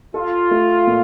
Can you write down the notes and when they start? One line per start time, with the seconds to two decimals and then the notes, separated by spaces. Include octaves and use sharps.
0.14 F4 A4
0.51 A3
0.87 A#2